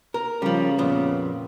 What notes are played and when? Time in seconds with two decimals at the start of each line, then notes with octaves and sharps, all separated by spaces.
0.14 A#4
0.42 C#3 F3 G3
0.78 F2 A#2 B3